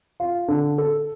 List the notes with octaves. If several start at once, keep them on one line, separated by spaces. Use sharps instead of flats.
F4
D3
A4